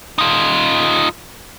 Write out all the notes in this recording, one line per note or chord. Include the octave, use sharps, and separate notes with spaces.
D#4 F4